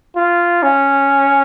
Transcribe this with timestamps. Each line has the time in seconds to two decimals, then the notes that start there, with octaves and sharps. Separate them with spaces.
0.16 F4
0.63 C#4